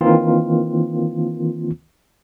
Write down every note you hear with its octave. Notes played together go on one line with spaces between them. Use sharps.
D#3 E3 A#3 C4 F4